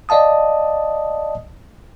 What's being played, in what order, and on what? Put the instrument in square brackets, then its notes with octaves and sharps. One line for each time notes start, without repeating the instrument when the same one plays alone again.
[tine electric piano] D5 D#5 F5 A5 D#6